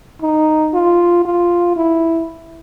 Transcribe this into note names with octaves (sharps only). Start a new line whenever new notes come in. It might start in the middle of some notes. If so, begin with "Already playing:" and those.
D#4
F4
F4
E4